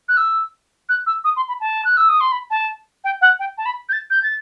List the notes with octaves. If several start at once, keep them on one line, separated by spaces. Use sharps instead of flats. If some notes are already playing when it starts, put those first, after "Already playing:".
F#6
E6
F#6
E6
D#6
C6
B5
A5
F#6
E6
D#6
C6
B5
A5
G5
F#5
G5
A5
B5
G6
A6
G6
A6